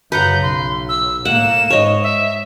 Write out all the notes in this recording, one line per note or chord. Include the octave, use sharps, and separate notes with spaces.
F#2 C#3 B4 F#5 A#5 G6
B1 C6
E6
A2 A#3 F#5 E7
G#2 C#5 D#5
E5